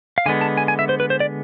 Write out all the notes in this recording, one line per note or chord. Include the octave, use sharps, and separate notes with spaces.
F5
D3 G#3 B3 G#5
A5
G#5
G#5
E5
C5
B4
C5
D5